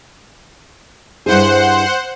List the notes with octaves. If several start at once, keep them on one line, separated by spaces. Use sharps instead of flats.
G2 E4 G#4 C5 F#5